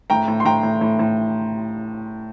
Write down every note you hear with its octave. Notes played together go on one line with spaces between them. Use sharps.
A2 G5 A#5
A2
C6
A2 G5 A#5
A2
A2
A2